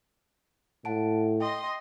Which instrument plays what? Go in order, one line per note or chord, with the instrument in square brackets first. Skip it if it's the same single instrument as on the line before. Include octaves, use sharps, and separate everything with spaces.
[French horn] A2 [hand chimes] F#5 A5 D7
[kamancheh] D#5 C6 [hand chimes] G5